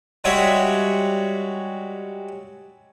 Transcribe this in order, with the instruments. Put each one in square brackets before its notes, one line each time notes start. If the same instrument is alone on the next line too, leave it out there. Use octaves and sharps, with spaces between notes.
[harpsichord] G3 G#3 C#4 F#4 C#5 E5